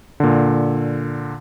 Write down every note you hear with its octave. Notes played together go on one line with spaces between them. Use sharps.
A#2 D3